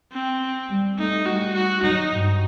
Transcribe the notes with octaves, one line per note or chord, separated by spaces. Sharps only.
C4
G3
A3 D#4
G3 F#4
F#4
F#3 D#4
G2